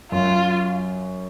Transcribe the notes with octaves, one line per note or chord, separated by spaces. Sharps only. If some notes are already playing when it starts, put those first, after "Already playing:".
F#2 F4